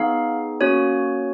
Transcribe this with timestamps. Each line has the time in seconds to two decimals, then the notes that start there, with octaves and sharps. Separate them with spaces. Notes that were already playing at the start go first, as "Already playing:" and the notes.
Already playing: B3 D#4 G#4 F5
0.61 A#3 C#4 F#4 C#5